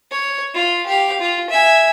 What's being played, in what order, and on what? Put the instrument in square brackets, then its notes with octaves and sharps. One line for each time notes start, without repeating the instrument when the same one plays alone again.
[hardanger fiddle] C#5
F4
G4 F5
F4
E5 G#5